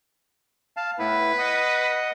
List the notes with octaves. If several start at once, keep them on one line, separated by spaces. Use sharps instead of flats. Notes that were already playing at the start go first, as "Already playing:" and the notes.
F5 A5
A2 B3 E4 B4
D#5 F#5 D#6